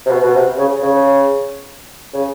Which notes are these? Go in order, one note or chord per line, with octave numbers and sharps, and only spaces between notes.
C3
B2
B2
C3
C#3
C#3
C#3